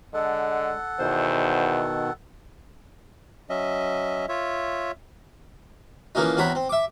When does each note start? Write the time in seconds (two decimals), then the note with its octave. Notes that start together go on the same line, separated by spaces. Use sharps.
0.14 D3 G#3 A4 F#5
0.99 E2 B2 D#3 C5
3.50 F#3 C#4 D#5 E5
4.29 F4 C#5 E5
6.15 E3 F3 A#3 C#4 D#4
6.37 E2 C4 F#4 C#5 A#5 B5
6.55 C4
6.69 E5 D6